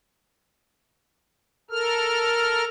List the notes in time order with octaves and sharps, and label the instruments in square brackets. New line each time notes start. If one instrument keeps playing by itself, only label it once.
[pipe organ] A4 A#4 F6